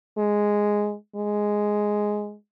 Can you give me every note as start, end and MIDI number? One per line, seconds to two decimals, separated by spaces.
0.18 0.95 56
1.16 2.35 56